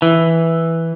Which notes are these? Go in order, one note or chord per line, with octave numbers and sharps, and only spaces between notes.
E3